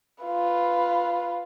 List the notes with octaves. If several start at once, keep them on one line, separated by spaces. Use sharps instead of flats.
F4 B4